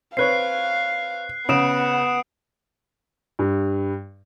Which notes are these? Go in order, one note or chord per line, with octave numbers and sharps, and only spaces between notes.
C4 B4 C#5 F5 F#6 C7
C#3 B3 F#5 D#6 D7 E7
G2